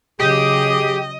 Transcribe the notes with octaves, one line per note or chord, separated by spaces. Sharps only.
C#3 F#3 G4 G#4 D#5